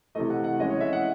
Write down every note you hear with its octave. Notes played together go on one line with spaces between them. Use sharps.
C3 E3 A3 D#5
F#5
F#5
E3 G#3 C#4 D#5
C#5
E5
F#5